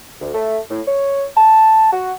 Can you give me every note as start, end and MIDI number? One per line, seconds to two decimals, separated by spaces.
0.21 0.31 38
0.34 0.59 57
0.71 0.81 45
0.88 1.25 73
1.37 1.90 81
1.93 2.14 66